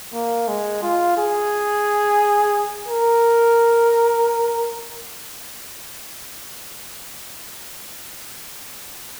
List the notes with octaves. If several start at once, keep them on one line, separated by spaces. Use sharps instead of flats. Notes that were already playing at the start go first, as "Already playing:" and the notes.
A#3
G#3
F4
G#4
A#4